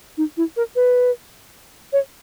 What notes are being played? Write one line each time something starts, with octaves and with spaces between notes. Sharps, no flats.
D#4
E4
A#4
B4
C#5